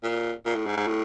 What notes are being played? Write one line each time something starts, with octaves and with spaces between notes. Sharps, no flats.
A#2
A#2
A2
G#2
G#2
A2